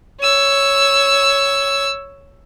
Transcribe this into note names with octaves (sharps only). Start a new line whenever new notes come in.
C#5 E6